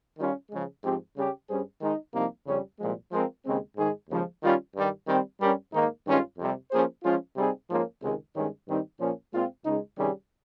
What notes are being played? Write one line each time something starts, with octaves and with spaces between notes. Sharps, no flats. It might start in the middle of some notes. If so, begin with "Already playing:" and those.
D#3 G3 C#4 F4
C#3 F3 G#3
G#2 F3 C4 G4
C#3 G3 C#4 G4
G2 G3 C#4 G#4 C5
D#3 G#3 D#4
C2 C3 F3 A#3 D#4
F2 C#3 G3 C#4
C2 A#2 F3 G#3
F3 G#3 C4 F4 A#4
D#2 C#3 G#3 C4
G#2 D#3 G#3 D#4 G#4
D#2 C#3 F3 G#3
D#3 G3 C#4 F4
G2 D#3 G3
D#3 G3 C4
G2 G3 C#4 G4 A#4
G#2 D#3 A#3 D#4
G2 D#3 G#3 C#4 F4
F2 C3 G3
F3 A#3 C#4 G#4 C5
F3 G#3 C#4 F4
C3 G3 C4 D#4 G#4
G#2 F3 A#3 C#4 F4
C#2 C3 D#3 G#3
G2 D#3 G#3 C#4
G2 D#3 G3 C4 D#4
A#2 F3 A#3 C#4
A#2 G#3 C4 F4
C#2 C#3 G#3 D#4
C3 D#3 G3 C#4 G#4